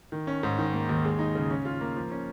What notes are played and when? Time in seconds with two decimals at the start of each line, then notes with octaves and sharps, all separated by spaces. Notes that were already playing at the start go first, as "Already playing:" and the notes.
0.12 D#3
0.27 C#4
0.43 G#2
0.58 D#3
0.73 A#3
0.89 D#2
1.04 G#3
1.19 D#4
1.35 C#3
1.50 C#4
1.65 F4
1.81 A#3
1.96 F3
2.11 C#4